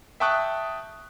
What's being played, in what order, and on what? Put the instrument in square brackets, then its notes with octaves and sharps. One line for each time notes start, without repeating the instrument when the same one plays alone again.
[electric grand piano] E5 G5 A5 C#6 D#6 F#6